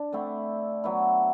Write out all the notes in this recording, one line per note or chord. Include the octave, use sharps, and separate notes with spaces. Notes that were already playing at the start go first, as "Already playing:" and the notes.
Already playing: D4
D3 A3 C4 E4
F#3 B3 E4